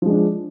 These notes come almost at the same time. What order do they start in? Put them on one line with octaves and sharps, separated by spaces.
F3 G#3 D4